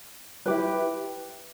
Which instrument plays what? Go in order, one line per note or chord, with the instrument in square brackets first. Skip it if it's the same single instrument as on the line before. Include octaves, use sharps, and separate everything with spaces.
[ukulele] E4 G4 B4